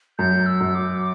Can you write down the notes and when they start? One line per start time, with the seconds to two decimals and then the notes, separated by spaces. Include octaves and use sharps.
0.18 F#2 G6
0.46 E6
0.60 F#2
0.75 D6